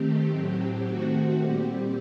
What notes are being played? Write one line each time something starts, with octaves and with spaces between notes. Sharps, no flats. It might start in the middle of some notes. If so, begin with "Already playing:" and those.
Already playing: D#3 A3 C4 G4
A2 F#3 C4
D#3 A3 C4 F#4
A#2 G3 C4 G4